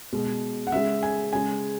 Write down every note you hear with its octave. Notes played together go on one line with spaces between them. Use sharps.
B2 G#3
F#5
C#3 G#3 E5
G#5
C#3 G#3 G#5